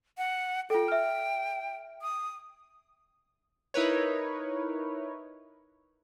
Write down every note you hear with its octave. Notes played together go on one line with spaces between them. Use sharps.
F#5
F4 A4 G5
E5 F6
D#6
D#4 E4 A#4 B4 C#5